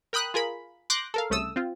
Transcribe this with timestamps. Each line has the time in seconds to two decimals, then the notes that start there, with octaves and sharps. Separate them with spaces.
0.13 A#4 G5 B5 D#6 F#6
0.34 F4 G#4 A#4 B5
0.90 C6 D6 F#6 G6 A#6
1.14 A4 A#4 F5
1.30 C2 C#3 A3 A4 D#6 E6
1.56 C4 F4